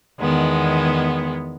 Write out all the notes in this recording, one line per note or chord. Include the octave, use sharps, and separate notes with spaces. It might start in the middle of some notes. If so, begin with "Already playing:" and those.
E2 D#3 G#3 B3